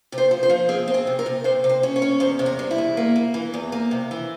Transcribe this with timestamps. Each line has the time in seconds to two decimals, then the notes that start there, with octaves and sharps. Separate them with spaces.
0.12 C3
0.18 C5
0.31 F3
0.43 C5
0.50 F3
0.69 C4 G#4
0.88 C4
0.94 G#4
1.07 C3
1.19 A#4
1.26 C3
1.44 C3 C5
1.64 C3
1.69 C5
1.83 C#4
1.96 C#5
2.02 C#4
2.20 E2 C5
2.39 C3
2.46 A#4
2.59 G3
2.71 E4
2.78 E2
2.97 A#3
3.16 A#3
3.34 E3
3.54 E2
3.72 A#3
3.91 C3
4.11 E3